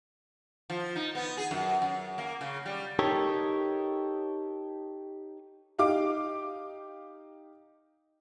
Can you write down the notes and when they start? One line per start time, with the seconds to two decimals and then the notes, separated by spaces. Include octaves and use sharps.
0.70 F3
0.96 D#4
1.15 B3
1.37 G#4
1.51 F#2
1.82 F#2
2.18 A#3
2.41 C#3
2.66 G3
2.99 D#4 G4 A4 A#4 C#5
5.79 D#4 G4 F5 D6